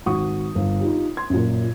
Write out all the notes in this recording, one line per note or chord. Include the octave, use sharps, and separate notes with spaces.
G#1 F#4 C#6 D#6
G1
D#4 F4 G4
C6 G#6
F#2 A#2